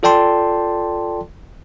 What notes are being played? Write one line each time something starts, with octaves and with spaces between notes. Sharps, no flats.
F4 A4 D5 G5 A5 C6